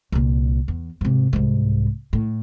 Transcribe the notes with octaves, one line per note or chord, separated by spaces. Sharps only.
C2 A#2
E2
G#2 C3
C2 G#2
A2